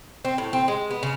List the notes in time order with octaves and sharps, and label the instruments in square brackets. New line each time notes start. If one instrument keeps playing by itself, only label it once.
[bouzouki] C4
A2
C4
G#3
B3
C#3